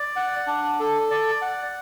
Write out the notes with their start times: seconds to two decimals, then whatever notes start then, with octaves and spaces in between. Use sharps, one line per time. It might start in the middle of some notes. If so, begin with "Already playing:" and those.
Already playing: D5
0.16 F#5
0.47 D4
0.80 A4
1.11 D5
1.42 F#5